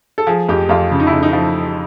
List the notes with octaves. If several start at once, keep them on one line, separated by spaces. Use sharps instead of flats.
A4
F3 G#4
F2 G4
F2 F4
C#3
D#4
E4
C#3
D#4
F3